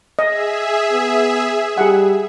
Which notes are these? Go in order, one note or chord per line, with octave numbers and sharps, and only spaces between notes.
G#4 D#5 E5
B3
G3 G#4 F#5